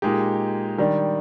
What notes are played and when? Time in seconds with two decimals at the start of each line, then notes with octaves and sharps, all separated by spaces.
0.02 A#2 G#3 D#4 G4
0.78 D#3 G3 D4